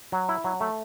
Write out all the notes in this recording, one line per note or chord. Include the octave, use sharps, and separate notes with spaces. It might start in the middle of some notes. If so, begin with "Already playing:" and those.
F#3
E4
F#3
A3